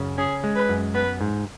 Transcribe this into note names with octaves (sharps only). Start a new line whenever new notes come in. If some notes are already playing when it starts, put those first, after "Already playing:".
Already playing: F#2 C#3
C#4 G#4
G#3
B4
F#2
B3 B4
G#2